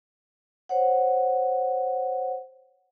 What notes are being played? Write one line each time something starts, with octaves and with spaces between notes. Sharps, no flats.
C5 C#5 F#5